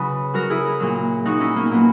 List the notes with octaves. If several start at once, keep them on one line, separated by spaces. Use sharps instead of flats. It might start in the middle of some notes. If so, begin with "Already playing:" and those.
Already playing: C#3 F#3 E4 F#4 G#4 B4
C#3 F#3 F#4 A#4
E4 G#4
A#2 F#3
A#2 F#3 D#4 F#4
C#4 E4
A#3 C#4
A#2 F#3 B3